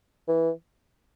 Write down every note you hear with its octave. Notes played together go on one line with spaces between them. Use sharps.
E3